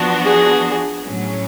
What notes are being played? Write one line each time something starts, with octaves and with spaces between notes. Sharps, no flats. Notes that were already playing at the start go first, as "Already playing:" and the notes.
Already playing: F3 B3 D4 F#4
G#4
A2 F#3 C#4